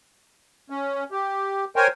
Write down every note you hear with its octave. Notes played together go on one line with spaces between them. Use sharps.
C#4
G4
A#4 C5 C#5 G5 G#5